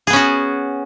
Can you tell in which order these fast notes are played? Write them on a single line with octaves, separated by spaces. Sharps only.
G#4 B3 C#4 F#4